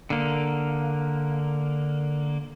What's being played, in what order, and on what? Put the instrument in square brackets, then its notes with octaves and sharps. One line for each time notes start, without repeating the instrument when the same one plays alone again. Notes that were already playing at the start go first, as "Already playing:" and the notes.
[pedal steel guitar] D3 A#3